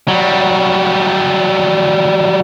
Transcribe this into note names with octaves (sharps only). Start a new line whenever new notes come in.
F#3 G3